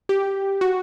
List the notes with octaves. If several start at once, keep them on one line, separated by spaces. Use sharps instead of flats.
G4
F#4